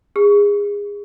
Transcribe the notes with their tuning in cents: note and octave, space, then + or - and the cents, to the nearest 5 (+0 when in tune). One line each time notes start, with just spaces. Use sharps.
G#4 -25